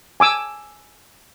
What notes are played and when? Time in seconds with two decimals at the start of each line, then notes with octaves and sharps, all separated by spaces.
0.20 G#5 D6 E6